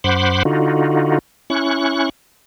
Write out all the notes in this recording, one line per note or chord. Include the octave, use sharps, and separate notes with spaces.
F#2 C5 F#5 B5 C6 D6
D3 D#4 F4 F#4
C#4 E4 C#6 F#6